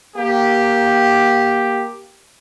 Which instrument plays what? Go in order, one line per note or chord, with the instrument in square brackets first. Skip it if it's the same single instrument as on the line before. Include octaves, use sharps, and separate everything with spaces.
[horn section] A#3 G4